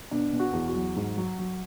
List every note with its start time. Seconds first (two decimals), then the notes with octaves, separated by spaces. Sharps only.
0.11 B2 D4
0.33 B2
0.39 F#4
0.53 E2
0.68 F#4
0.75 F#3
0.96 G#2
1.17 F#3
1.39 F#3